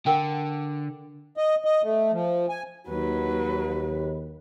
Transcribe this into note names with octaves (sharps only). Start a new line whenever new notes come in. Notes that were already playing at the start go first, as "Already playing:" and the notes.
D3 A#4 F#5 G5
D#5
D#5
A3
F3
G#5
D#2 F#3 B4